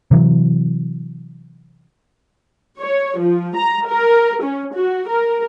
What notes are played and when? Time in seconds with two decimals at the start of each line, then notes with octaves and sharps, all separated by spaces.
0.11 C3 E3 F#3
2.81 C#5
3.18 F3
3.56 A#5
3.88 A#4
4.42 C#4
4.75 F#4
5.08 A#4